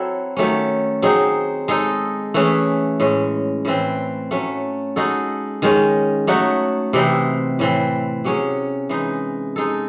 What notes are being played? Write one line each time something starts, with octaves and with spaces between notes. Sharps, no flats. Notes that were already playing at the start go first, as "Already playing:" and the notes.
Already playing: F#3 C4 E4 A4
D#3 F#3 A3 C#4
F#3 C4 D#4 G#4
G#3 D#4 A4
E3 A3 C#4 G#4
A2 G#3 C#4
A2 E3 C4
F#3 A3 C#4
G#3 D#4 F#4 A4
D#3 G#3 C#4
F#3 A3 D#4 F#4
C3 E3 C4 D#4
A2 E3 C4
C3 F#3 C#4 G#4
E3 G#3 D#4
G#3 D#4 A4